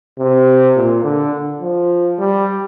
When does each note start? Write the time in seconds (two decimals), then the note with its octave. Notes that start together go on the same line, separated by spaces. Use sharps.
0.19 C3
0.77 A#2
1.04 D3
1.62 F3
2.19 G3